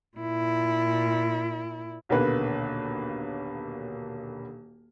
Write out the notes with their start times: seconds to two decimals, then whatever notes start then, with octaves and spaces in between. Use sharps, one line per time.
0.17 A#2 E4
2.09 D#1 B1 D3 A#3 B4